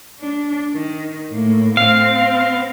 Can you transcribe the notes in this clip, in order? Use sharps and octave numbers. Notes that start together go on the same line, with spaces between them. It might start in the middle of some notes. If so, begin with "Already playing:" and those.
D4
D#3
A2 A#3
C4 F5